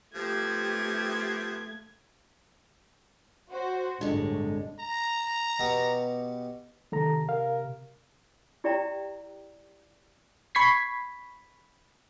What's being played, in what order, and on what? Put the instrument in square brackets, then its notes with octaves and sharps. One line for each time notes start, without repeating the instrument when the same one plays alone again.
[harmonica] F3 B3 C4 [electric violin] A3 G#6 [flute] G4
[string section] F#4 C5
[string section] G1 C2 A2 [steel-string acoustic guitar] D3 G#3
[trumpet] A#5
[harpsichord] B2 B3 G4
[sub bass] C3 [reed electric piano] D#3 A4 A#5
[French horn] A#4 [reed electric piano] F5
[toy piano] E4 G4 D5 E5 G5 A#5
[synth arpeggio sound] B5 C#6 G#6 B6 C7